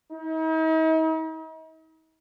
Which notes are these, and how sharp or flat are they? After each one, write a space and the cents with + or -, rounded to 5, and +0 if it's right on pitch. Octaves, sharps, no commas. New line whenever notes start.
D#4 +45